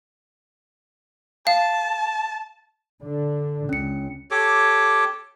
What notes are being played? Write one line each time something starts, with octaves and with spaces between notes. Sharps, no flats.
F5 A5
D3 D4
C#2 C#4 C#7
G4 A4 C#5 D6